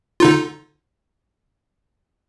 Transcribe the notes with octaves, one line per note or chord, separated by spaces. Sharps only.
D3 D#4 F4